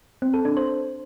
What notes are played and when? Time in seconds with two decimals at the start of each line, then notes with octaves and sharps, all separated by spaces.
0.22 C4
0.34 A4
0.45 D4
0.57 C5